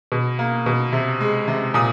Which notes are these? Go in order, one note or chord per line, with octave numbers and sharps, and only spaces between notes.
B2
A#3
B2
C3
G#3
C3
A#2 D#6